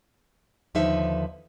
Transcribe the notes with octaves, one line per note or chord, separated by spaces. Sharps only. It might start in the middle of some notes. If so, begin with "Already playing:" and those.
D#2 D3 F3 D#4 B4 E5